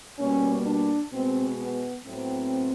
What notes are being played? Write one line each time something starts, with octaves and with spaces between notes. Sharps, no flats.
B2 G3 A#3 C#4
D4
B2 G#3 B3 C4
B3
A2 F#3 B3 C4